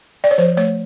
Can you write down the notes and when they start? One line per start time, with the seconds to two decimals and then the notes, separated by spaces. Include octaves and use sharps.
0.24 D5
0.31 C#5
0.38 F3 C5
0.57 A3 C#5